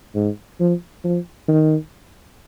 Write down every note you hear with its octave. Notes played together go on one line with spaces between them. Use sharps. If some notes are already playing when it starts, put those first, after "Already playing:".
G#2
F3
F3
D#3